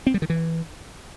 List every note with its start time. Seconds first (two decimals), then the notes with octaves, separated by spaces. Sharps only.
0.07 C4
0.14 G3
0.22 D#3
0.30 E3